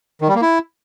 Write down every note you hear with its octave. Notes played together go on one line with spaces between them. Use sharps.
D#3
G3
A#3
E4